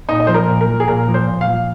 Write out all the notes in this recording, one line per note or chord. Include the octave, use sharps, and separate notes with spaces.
A#2 D#4
D#5
F3 C5
A#4
A#2
A#4
F3
G#4
A#2 A#4
F3
C5
A#2
F5
F3